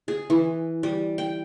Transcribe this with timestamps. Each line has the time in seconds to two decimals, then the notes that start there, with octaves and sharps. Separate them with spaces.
0.08 G#4
0.30 E3
0.83 G3
1.18 G5